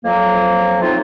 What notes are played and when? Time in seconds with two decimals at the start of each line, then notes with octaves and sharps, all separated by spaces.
0.05 F2 F#3 A#3
0.82 F#3 A3 A#3 C4 D#4 F4